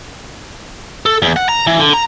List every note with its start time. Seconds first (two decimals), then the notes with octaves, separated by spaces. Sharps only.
1.06 A4
1.22 E2
1.36 F#5
1.49 A#5
1.67 E3
1.80 D3
1.93 A#5